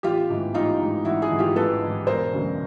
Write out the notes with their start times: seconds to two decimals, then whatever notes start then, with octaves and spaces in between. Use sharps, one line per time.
0.03 A1 F4 G4
0.30 G#2 E3
0.54 A1 D#4 F4
0.79 G#2 E3
1.05 A1 E4 F#4
1.22 F#4 G#4
1.30 G#2 E3
1.39 F4 G4
1.56 A1 A4 B4
1.82 G#2 E3
2.07 E1 A#4 C5
2.32 D2 C#3 F#3